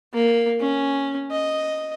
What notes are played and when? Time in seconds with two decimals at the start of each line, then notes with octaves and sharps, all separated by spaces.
0.14 A#3
0.60 C#4
1.31 D#5